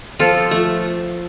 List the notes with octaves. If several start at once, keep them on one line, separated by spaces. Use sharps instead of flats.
F3 F4 A4
A3